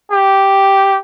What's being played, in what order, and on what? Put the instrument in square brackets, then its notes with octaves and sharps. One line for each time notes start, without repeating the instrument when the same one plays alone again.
[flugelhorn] G4